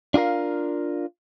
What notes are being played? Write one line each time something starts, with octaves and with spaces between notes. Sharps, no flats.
D4 F4 F#4 A#4 F5